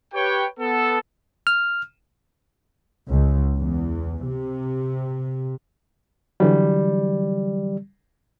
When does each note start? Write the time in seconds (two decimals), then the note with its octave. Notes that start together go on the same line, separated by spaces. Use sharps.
0.14 G4 B4 C#5 G5
0.59 B3 A4
1.47 F6
3.08 C#2
3.57 E2
4.26 C3
6.40 D3 E3 F#3 G3